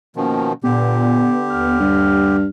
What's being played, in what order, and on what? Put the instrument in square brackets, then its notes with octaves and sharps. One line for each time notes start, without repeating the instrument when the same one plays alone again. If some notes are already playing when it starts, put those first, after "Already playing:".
[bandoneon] B2 D#3 F3 [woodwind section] A#3 C#4
[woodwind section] A#2 [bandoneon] D3 G4 [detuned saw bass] B3
[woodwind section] D#2 F6
[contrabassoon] G2